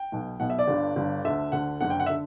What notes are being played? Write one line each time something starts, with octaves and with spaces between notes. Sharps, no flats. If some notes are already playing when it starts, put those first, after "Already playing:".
Already playing: G5
B1 B2
B1 B2 F#5
E5
D5
G1 G2 D3
G1 G2 D3
D2 D3 E5
D2 D3 F#5
F#1 F#2 D3 F#5
G5
F#5
E5
D3